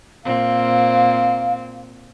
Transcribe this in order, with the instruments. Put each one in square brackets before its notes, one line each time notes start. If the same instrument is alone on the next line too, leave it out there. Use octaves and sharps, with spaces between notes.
[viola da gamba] A#2 C4 [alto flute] F5